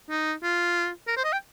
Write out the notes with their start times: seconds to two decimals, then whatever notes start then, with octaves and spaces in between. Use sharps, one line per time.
0.10 D#4
0.43 F4
1.07 A#4
1.17 C5
1.24 D#5
1.32 G5